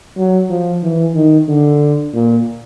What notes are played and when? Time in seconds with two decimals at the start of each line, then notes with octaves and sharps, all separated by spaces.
0.17 F#3
0.50 F3
0.83 E3
1.15 D#3
1.48 D3
2.14 A#2